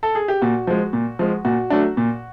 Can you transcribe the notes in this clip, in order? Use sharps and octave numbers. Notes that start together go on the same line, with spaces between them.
A4
G#4
G4
A#2 F#4
F3 G#3
A#2
F3 G#3
A#2 F#4
F#3 A3 D4
A#2